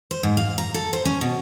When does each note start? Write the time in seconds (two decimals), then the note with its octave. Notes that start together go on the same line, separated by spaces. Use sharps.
0.11 C5
0.23 G#2
0.37 F5
0.58 A#5
0.74 A4
0.93 C5
1.05 C#4
1.21 B2